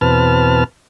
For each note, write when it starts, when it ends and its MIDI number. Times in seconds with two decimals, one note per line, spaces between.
0.01 0.64 40
0.01 0.64 47
0.01 0.64 60
0.01 0.64 71
0.01 0.64 81
0.01 0.64 89